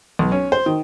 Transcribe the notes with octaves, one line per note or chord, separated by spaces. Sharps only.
B1
C#4
C5
D#3